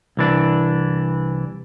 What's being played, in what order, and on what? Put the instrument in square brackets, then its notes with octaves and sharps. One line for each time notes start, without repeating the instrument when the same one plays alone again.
[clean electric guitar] C2 E3 D4